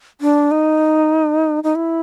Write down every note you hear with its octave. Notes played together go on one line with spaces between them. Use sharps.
D4
D#4
D#4
E4